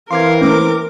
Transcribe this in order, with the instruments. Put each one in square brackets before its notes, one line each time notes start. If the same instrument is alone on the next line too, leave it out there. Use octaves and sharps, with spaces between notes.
[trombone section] E3 C4 [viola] A#4 [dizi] F5 [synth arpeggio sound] C6 D6 G#6
[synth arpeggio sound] A3 A#3 C#4 [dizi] D6